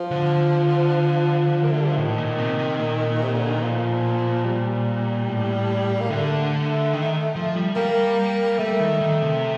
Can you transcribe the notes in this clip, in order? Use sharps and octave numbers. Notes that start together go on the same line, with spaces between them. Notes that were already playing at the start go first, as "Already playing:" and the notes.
Already playing: F3
D3
A#3
A3
G3
F3
A2 D#3
A#2
C3
C3
A#2
C3
D3
D#3
F3
G3
A2
A#3
D3 A3
D#3
F3
G3
G3 A#3
G3 A3
D#3
D#3
C3